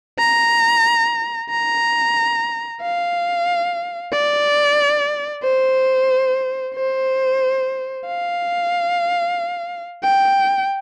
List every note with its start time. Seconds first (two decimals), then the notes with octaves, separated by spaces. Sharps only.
0.19 A#5
1.50 A#5
2.81 F5
4.12 D5
5.44 C5
6.75 C5
8.06 F5
10.03 G5